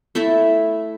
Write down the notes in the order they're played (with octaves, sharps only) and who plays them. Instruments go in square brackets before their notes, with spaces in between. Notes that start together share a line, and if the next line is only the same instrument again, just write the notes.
[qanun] A3 E4 A4 E5